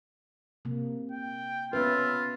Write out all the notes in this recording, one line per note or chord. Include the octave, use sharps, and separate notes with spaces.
C3 A#3
G5
B3 C#4 F4 B4 E5